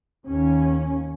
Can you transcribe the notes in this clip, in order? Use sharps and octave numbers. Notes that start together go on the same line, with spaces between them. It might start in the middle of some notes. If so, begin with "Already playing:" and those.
D#2 C#4